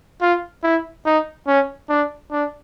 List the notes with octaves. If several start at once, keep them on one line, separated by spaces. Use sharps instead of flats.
F4
E4
D#4
C#4
D4
D4